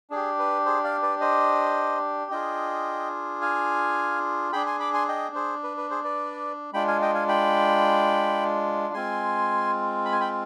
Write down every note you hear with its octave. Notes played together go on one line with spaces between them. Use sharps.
D4 G4 G#4
B4
G#4 C5
D5 F5
B4 D5
C5 D#5
D4 F4 G#4 D#5 G5
F5 G#5
D4 G#4 G5 B5
G#5 C6
B5 D6
G#5 C6
D#5 G5
G#4 C5
B4
B4
G#4 C5
B4 D5
G#3 D4 F4 G5 B5
F5 G#5
D#5 G5
F5 G#5
G5 B5
G#3 C4 F4 G#5 C6
B5
G#5
G5 B5